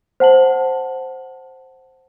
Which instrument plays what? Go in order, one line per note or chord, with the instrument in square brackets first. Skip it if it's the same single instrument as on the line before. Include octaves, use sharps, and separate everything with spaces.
[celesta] C5 F#5 A5 F#7